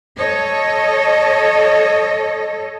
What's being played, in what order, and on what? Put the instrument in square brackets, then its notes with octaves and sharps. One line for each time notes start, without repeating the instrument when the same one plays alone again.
[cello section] A4 C#5 D#5